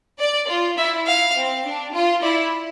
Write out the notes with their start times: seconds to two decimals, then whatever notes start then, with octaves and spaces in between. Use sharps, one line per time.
0.20 D5
0.49 F4
0.78 E4 E5
1.07 F5
1.36 C4
1.65 D4
1.94 F4
2.23 E4 D5